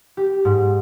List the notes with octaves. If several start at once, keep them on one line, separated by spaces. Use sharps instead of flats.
G4
G#2